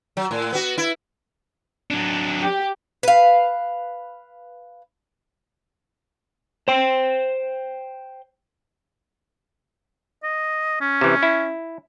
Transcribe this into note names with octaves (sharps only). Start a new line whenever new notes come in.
F#3
A2
B3 F#4
E4
F#3 D4
G4
B4 F5
C5 G5
D#5
C#4
C3 E3
E4